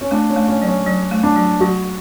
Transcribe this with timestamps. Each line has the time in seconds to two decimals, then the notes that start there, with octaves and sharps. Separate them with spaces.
0.01 C#4
0.11 A3 D4
0.29 C#4
0.36 A3
0.48 C#4
0.62 F#3
0.67 C#4
0.86 F#3
1.11 A3
1.23 D4
1.36 F#3
1.60 F#3 F#4